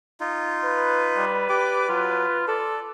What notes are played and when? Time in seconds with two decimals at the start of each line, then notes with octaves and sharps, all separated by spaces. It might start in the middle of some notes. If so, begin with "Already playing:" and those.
0.20 D#4 F4
0.66 B4
1.17 G3
1.49 G4 D5 D6
1.89 F#3 F4
2.48 A4 D5